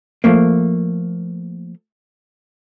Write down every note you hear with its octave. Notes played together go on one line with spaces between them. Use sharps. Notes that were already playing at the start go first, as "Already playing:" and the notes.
F3 A3 A#3